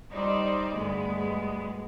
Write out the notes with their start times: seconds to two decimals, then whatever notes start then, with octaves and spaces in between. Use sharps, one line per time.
0.11 G3 D#4 C5 D5
0.72 D2 G2 G#3 B3